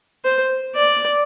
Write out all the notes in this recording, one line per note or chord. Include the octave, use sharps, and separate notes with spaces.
C5
D5